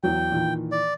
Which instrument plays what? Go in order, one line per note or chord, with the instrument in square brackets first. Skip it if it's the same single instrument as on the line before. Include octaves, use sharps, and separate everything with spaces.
[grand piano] E2 F#3 [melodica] G5
[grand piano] A#2 D#3 E3
[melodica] D5